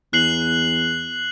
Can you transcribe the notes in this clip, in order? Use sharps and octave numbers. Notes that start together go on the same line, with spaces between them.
E2 F#6 C7 F#7